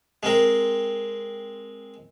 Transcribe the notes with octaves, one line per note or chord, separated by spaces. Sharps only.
G#3 C4 A#4